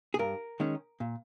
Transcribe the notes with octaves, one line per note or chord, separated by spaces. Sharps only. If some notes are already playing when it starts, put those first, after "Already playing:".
G#4
G2 A#4
D#3 G#3 C#4
A#2